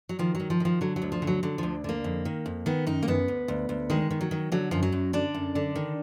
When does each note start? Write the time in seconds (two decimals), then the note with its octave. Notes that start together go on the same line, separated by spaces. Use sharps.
0.09 F#3
0.19 D#3 F3
0.35 F#3
0.40 D#3
0.50 F3
0.60 D#3 F3
0.81 D3 F#3
0.96 F#3
1.02 D2
1.12 F3
1.22 D3
1.27 F#3
1.43 D3 F#3
1.58 D2 F3
1.84 D3 A#3
2.04 F2
2.25 D#3
2.46 F2
2.66 D#3 B3
2.87 F#2 D#4
3.02 A#3
3.08 F#2 B3
3.28 D2
3.48 D2
3.69 D2
3.90 D#3 G#3
4.10 D#3
4.21 F#3
4.31 D#3
4.52 D3 F#3
4.71 F#2 F3
4.83 F#3
4.92 F#2
5.13 D3 D4
5.34 F#2
5.55 D3
5.75 D#3